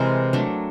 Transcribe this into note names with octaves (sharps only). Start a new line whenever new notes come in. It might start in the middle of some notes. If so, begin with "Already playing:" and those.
Already playing: C3 E3 G#3 C4 A#4
F#3 A3 D4